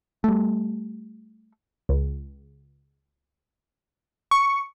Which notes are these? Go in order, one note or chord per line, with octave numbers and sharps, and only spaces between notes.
G3 A3
C#2
C#6